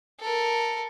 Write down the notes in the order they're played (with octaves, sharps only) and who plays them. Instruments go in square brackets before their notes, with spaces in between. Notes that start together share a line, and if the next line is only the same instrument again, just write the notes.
[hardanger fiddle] A4 A#4